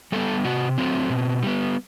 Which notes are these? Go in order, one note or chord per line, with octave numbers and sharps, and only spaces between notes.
G3 B3 A4
C3 F#4
F#3 A3 C4
B2
G3 B3